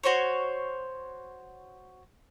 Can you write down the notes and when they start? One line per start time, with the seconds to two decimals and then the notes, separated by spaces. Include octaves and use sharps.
0.03 F#4 C5 C#5 C#6